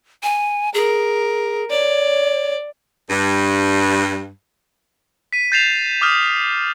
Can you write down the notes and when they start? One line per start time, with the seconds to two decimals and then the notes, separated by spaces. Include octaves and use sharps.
0.23 G#5
0.74 G#4 A#4
1.70 C#5 D5
3.10 G2
5.33 B6 D#7
5.52 G6 A6 C7 E7 F7
6.01 D6 D#6 F6 G6